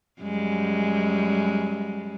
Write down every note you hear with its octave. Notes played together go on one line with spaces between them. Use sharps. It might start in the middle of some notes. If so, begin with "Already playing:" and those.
F#2 G3 G#3